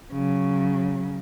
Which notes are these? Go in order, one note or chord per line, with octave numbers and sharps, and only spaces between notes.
C#3 F#3